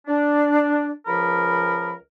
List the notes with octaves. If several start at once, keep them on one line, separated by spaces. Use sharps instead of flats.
D4
C#2 F3 A#4 B5